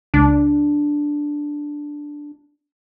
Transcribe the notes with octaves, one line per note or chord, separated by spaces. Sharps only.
C#2 D4